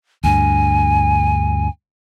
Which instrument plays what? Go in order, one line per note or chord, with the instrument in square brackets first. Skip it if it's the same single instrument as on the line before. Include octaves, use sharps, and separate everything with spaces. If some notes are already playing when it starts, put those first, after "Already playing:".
[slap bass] D2 G2 [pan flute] G#5